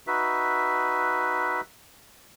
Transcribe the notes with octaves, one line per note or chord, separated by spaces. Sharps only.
D#4 F#4 B4 E5